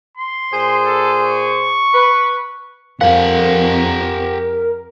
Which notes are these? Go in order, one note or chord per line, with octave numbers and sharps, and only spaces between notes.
C6
A#2 G#4 C5
A4
C#6
B4
F2 G4 A#4 F5 F#5